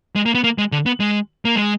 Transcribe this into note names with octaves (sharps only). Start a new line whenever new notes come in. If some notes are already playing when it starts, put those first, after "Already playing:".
G#3
A#3
B3
A#3
G#3
D3
B3
G#3
A#3
G#3